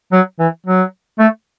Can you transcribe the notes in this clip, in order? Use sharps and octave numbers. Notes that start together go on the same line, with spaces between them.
F#3
E3
F#3
A3